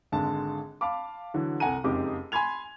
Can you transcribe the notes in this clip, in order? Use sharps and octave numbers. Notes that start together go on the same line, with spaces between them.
G#1 D3 G#3 A5
F5 A5 B5 D6
D3 E3 F#3
C2 A4 F#5 G#5 A#5 D#7
F#1 F2 G#3 D#4 G4 D6
G#5 B5 C6 G#6 F7